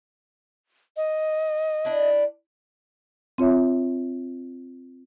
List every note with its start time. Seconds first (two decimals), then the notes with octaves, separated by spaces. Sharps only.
0.97 D#5
1.85 D4 E4
3.38 C4 F4 C#5 E5